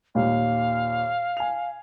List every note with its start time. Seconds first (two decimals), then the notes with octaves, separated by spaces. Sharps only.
0.15 D#2 A#2 F5
1.37 G#5 F7